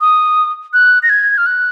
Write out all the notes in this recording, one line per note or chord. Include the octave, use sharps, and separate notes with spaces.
D#6
F#6
A#6
G#6
F6
F#6